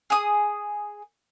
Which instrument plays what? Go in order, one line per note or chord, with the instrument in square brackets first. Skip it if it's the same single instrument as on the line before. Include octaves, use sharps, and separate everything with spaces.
[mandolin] G#4 D#6